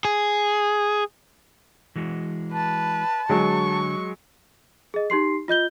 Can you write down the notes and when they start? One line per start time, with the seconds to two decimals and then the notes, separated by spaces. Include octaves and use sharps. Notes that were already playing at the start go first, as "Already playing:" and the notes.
0.05 G#4
1.96 E3 G#3 F#4
2.53 B4 A5
3.29 D3 F#3 G#3 C#6
4.94 G#4 D#5
5.10 D#4 G4 C6 C7
5.48 F4 D#5 G6 G7